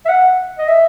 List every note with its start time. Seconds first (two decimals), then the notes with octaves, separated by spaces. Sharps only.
0.05 E5
0.09 F#5
0.58 D#5
0.68 E5